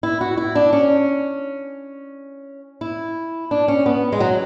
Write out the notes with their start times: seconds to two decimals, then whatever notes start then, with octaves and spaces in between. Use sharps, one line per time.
0.03 E4
0.21 F#4
0.37 E4
0.55 D4
0.73 C#4
2.81 E4
3.51 D4
3.68 C#4
3.86 B3
4.12 G#3
4.20 F#3